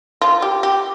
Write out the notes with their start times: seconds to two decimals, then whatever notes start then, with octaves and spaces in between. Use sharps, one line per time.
0.21 F4
0.42 G4
0.63 G4